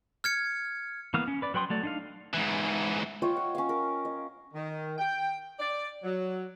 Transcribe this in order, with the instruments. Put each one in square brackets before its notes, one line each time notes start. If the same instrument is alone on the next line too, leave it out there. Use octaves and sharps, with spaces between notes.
[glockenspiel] F6 G#6 C#7
[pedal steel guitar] E3 A#3 B3 F5 D#6
C#4
B4 D5
F#3 B4 G5 C6 D#6
F#3 A3 D5
D4 D#4 F5
[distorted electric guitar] G#2 E3
[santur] F4 C#5 D#5 G5
F#5
C#4 F5
A#4
D#5
[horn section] D#3
G5
D5
F#3